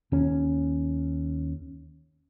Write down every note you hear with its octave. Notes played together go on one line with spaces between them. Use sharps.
D#2 C#4